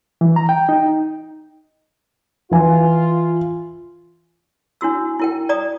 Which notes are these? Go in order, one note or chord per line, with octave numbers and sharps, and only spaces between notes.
E3
A#5
G5
D#4
E3 F4 G#5
D4 E4 F#4 E6
E4 A#4 G5
D5 A#5 D#6